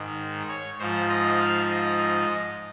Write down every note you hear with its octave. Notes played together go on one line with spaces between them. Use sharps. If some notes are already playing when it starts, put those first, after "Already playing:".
Already playing: G#2 D#3
C#5
G#2 F3 C5
D#5
F5
D#5